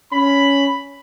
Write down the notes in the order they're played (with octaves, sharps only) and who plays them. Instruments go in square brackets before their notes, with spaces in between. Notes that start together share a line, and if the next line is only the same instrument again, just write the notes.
[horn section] C#4 B5